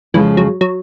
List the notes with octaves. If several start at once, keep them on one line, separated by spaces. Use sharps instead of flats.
F2 C#3 E3 F3 G#3
F#3
F#3